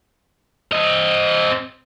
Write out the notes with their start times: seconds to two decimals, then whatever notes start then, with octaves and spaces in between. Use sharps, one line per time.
0.72 C4 D#5